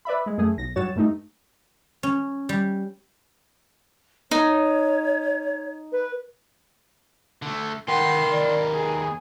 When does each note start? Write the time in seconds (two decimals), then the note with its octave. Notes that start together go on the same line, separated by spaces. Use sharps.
0.05 B4 D5 E5 B5
0.26 G#3
0.38 F#2 A3 G#4
0.58 B1 A#6
0.76 G2 F#3 F#4 C#5 A6 E7
0.96 G2 A3 D#4
2.03 C#4
2.49 G3
4.31 D#4 C#5
5.92 B4
7.42 D3 A3
7.88 D#2 A#4 B4 F#5 G5 C6
8.32 D5
8.73 G#4 G#5